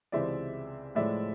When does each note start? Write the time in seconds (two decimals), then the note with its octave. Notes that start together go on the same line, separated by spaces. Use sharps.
0.12 C#2 C3 E3 G#3 C4 D5 E5
0.95 A2 F3 G#3 D5 E5